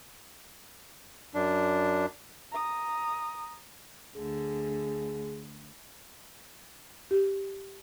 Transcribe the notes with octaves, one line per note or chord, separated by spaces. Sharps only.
F#2 D4
A#5 D#6
D2 D3 G#4
G4